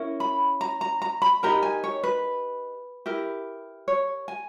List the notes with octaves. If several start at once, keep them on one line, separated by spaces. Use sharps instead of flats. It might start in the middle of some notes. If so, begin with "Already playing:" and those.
Already playing: C#4 E4 A#4
B5
A#5
A#5
A#5
B5
D#4 G4 A#4 A#5
G#5
C#5
B4
E4 G4 A#4
C#5
G#5